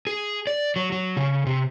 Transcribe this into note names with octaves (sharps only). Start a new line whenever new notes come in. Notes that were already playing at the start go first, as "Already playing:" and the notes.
G#4
D5
F#3
F#3
C#3
C3